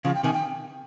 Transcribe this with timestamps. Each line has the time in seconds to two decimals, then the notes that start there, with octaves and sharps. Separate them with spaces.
0.05 C#3 F3 F5
0.15 G5
0.23 C3 D#3 G#5
0.33 G5